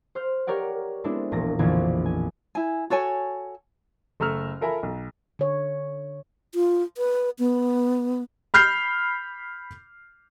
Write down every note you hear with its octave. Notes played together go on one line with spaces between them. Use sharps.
C5 C6 F6 G6
G4 A#4 C#5 D5 F#5
G#3 B3 C4 D4 E4 A4
E1 A#1 A#2 A5 A#6
A#1 F2 B2 D3 E3 G#6
G#5
E4 G#5
F#4 A4 C#5 G#5
F#1 A3 A#5 E6 F6
F4 A4 A#4 E5 G#5 B5
B1
D3 C#5
F4
B4
B3
B5 F6 G6 C7